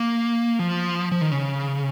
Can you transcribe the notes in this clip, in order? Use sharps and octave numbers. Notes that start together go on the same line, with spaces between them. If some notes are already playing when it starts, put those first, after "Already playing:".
Already playing: A#3
F3
F3
D#3
C#3